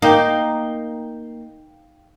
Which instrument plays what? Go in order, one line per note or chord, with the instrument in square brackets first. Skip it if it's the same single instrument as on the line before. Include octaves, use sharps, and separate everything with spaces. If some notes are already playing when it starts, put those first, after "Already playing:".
[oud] A#3 [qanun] D#4 [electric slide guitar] F5 G5